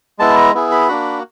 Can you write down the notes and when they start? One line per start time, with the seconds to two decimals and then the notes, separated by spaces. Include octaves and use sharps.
0.19 G#3 B3 E4 A5
0.36 A#5
0.54 B3 E4 G#4
0.72 B5
0.88 A#3 D4 F#4